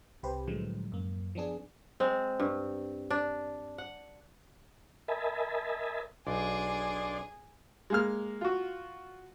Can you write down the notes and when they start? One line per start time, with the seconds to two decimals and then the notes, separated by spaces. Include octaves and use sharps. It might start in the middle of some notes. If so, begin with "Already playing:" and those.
0.23 C2 C3 G4 B4 C5
0.47 A2 D3 F3 F#3 G#3
0.92 F#2 A#3
1.35 F3 B3 D4 G#4
2.00 G#3 C4
2.40 G2
3.10 D4
3.78 F#5
5.08 A#4 D#5 E5 G#5 A5 B5
6.27 B1 D4 G#4 D5 C6
7.90 G#3 A#3 F6
8.41 F4 F#4